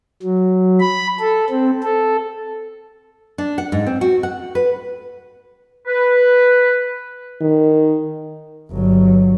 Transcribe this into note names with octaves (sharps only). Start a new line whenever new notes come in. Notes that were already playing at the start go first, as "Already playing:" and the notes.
F#3
B5
A4
C4
A4
D4
F#5
G#2
C4
F#4
F#5
B4
B4
D#3
G1 F#3